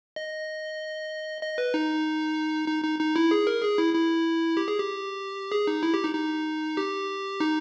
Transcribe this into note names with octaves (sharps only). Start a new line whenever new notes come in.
D#5
D#5
B4
D#4
D#4
D#4
D#4
E4
G#4
A#4
G#4
E4
E4
G4
G#4
G4
G#4
D#4
E4
G4
D#4
D#4
G4
D#4